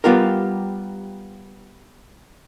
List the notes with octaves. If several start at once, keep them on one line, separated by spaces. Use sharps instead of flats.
G3 B3 F4 G4 A#4